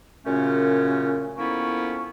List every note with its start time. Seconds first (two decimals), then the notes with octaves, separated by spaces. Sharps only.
0.25 F#2 A#2 C#3 A3 C#4
1.38 F2 A#3 B3 C#4 E4 C#6